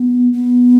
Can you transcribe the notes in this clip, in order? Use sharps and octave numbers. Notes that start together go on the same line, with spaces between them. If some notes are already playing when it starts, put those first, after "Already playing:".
Already playing: B3
B3